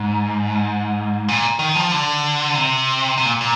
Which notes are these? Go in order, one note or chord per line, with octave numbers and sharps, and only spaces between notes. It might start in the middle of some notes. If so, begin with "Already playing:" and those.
Already playing: G#2
A#2
D#3
F3
D3
C3
C3
A#2
A#2